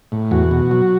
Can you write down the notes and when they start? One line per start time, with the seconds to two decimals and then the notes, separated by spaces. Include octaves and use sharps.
0.12 A2
0.31 E2 F#4
0.51 B2
0.71 F#3